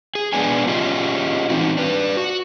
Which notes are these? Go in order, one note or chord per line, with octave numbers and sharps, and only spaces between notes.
G#4
F2 B2 G#3 B3 D4 G#5
C#4 F4 G4 G#4 D#5
E3 C4 D#4 F#4
D4 B4
F#4